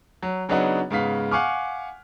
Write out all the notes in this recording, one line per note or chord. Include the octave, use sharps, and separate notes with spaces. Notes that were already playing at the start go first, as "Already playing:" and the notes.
F#3
C#3 F#3 B3 D4 D#4 F#4
G#2 C#3 B3 F5 B6
F5 F#5 G#5 C#6 D6 F6